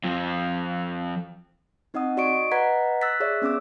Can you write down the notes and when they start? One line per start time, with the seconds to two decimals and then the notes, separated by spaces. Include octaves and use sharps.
0.04 F2 F3
1.94 C4 D#4 D#5 F#5 D#6
2.17 F#4 D5 D#5 C#6 D7
2.52 B4 D#5 F#5 A#5 G#6 B6
3.01 E6 F#6 A6 B6
3.20 G#4 C#5 D5 E5
3.42 B3 C#4 G#4 D6 E6